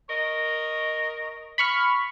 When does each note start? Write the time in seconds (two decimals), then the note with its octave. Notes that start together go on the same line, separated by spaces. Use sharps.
0.10 A#4 C#5 D#5
1.58 B5 C#6 F6